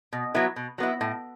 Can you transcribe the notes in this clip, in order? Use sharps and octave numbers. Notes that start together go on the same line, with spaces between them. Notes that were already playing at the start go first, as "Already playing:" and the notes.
B2
F#3 B3 E4
B2
F#3 B3 E4
A2